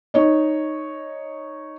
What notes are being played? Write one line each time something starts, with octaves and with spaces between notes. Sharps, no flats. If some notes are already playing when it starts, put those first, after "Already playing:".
D#4 C#5 D#5